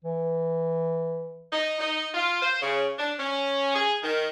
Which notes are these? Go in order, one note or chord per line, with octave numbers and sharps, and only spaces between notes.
E3
D#4
D#4
F4
C5
C#3
D4
C#4
G#4
D#3